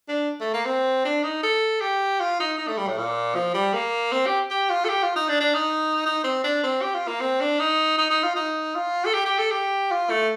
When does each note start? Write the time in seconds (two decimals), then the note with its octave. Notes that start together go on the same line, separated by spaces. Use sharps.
0.09 D4
0.41 A3
0.54 A#3
0.66 C4
1.05 D4
1.24 D#4
1.43 A4
1.81 G4
2.20 F4
2.40 D#4
2.59 D#4
2.68 A3
2.78 G3
2.88 A2
2.98 A#2
3.35 F3
3.54 G3
3.74 A#3
4.12 C4
4.26 G4
4.51 G4
4.70 F4
4.85 A4
4.89 G4
5.03 F4
5.16 D#4
5.29 D4
5.41 D4
5.55 D#4
6.06 D#4
6.24 C4
6.44 D4
6.64 C4
6.82 G4
6.95 F4
7.08 A#3
7.21 C4
7.41 D4
7.60 D#4
7.98 D#4
8.11 D#4
8.23 F4
8.36 D#4
8.75 F4
9.05 A4
9.14 G4
9.26 G4
9.39 A4
9.51 G4
9.91 F4
10.10 A3